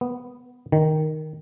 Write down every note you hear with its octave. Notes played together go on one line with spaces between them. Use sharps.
B3
D#3